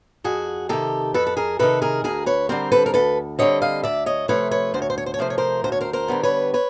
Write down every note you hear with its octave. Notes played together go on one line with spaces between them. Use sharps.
F2 F#4 G#4
C3 D#3 G4 A4
F2 A4 B4
A4
G#4 A#4
C3 D#3 A4 B4
G#4 A#4
D2 G#4 A#4
B4 C#5
D3 G3 C4 A#4 C5
A4 B4
A#4
D2 A4 B4
D3 G3 C4 C#5 D#5
D#5 F5
D2 D5 E5
C#5 D#5
C3 F3 A3 B4 C#5
B4 C#5
D2 C5
C#5
C5
C#5
C5
C#5
C3 F3 A3 C5
C#5
A#4 C5
D2 C5
C#5
A#4 C5
A#4 C5
D3 G3 B3
B4 C#5
B4 C#5